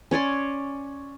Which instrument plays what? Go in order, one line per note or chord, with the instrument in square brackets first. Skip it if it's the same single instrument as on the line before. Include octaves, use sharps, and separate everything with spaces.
[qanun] C#4 C#5 D5 C6